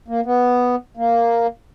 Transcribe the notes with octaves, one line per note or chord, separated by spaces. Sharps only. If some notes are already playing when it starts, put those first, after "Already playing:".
A#3
B3
A#3